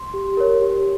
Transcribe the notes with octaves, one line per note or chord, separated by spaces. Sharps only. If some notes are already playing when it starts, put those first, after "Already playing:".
Already playing: C6
G4
A#4 C#5
G4